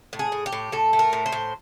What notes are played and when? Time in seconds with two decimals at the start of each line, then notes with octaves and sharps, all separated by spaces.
0.13 A2
0.19 G#4
0.32 A2
0.46 G4
0.53 A2
0.72 A2 A4
0.93 A3
0.99 A#4
1.13 A2
1.26 C5
1.32 A2